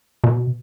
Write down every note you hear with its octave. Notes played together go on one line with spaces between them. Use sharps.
B2